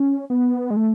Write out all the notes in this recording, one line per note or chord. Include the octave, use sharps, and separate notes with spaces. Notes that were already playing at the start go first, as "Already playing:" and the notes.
Already playing: C#4
B3
G#3
A3